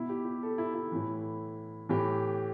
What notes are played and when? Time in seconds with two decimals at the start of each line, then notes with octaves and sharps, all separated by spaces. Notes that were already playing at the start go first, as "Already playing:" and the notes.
Already playing: B2 E4
0.09 G4
0.25 G4
0.43 A4
0.58 E4
0.74 E4
0.92 A2 E3
1.89 A2 E3 G4